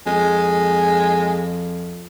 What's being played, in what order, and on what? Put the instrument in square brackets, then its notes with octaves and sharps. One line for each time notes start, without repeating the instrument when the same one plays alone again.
[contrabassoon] F2 [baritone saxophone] G#3